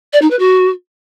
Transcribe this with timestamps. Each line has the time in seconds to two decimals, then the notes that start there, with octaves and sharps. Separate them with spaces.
0.13 D5
0.22 D#4
0.30 B4
0.39 F#4